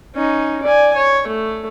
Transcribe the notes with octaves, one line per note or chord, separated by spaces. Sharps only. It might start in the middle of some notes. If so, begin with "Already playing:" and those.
C#4 D#4
D5 G#5
C#5
A3